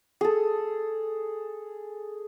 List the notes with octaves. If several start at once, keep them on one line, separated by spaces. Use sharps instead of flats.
G#4 A4